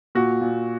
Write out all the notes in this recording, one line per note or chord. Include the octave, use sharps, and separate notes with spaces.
A#2 F#4
A#2